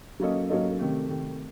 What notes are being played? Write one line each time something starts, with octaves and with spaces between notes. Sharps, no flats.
F#3 A#3 C#4 A4 D#5
F#3 A#3 C#4 A4 D#5
C3 D#3 A3
C3 D#3 A3